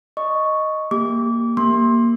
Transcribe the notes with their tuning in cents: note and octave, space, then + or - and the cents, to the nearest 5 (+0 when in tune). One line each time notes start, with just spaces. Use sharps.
D#5 +0 C#6 +0
A#3 +0 G4 +15 D6 -25
A#3 +0 C6 +20